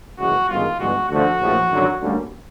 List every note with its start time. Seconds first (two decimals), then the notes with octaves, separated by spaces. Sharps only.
0.18 F#1 F#2 C#3 E3 G#3 F#4
0.48 G1 F#2 D#3 G#3 F4
0.79 G1 G2 E3 G#3 F#4
1.09 D2 D3 F3 A3 F#4
1.40 A#1 A2 F3
1.70 G#1 F#2 D3 F#3
2.01 D2 D3 G3 A#3 C#4